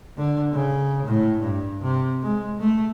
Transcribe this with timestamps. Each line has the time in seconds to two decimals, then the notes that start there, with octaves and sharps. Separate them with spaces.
0.17 D3
0.52 C#3
1.06 A2
1.40 G2
1.82 C3
2.22 G#3
2.60 A3